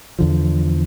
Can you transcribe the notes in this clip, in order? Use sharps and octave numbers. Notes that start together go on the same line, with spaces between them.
E2 D3 F3